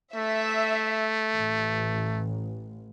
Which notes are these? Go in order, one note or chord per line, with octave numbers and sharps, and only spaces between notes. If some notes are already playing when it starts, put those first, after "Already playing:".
A3 E5
A1